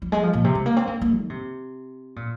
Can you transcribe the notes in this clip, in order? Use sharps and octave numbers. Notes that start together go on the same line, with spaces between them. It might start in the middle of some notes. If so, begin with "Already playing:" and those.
F3
G#3
F3
A#2
C3
G#3
A#3
C4
A#3
A#3
D#3
C3
A#2